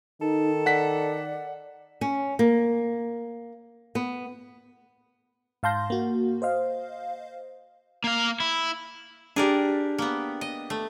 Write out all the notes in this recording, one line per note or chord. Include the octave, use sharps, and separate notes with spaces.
D#3 D#4 A4
D5 F#5 B6
C#4
A#3
B3
G#2 F5 A5 C6 G6 A#6
A#3 F#4
C5 D#5 F5
A#3 F5
E4
D4 G4 G#4 A#4 D5
A#3 B3
D#5
A3